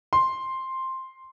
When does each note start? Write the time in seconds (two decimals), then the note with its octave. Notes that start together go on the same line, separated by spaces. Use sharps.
0.13 C6